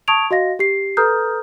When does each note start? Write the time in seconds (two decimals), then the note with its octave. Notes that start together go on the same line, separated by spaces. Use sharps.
0.08 A5 C#6 D#6 G#6 D7 F7
0.31 F#4 D#5 F5 A#6
0.59 G4 C7
0.97 A4 B4 A#5 D#6 F6 G6